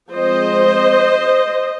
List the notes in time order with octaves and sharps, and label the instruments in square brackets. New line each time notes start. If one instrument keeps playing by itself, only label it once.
[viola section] F3 G#3 C4 C5 D#5